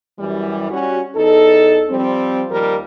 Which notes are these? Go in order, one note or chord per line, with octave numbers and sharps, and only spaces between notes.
F#2 E3 G3
G3 C#4 F#4
E2 D#4 A4
F3 G3 C4
D#2 F3 G3 A#4